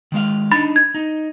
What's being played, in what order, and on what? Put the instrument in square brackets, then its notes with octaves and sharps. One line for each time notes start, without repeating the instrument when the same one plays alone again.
[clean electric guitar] D#3 G#3 F5
[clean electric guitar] D4 D#4 [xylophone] B5 A6
[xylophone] G#6
[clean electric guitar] D#4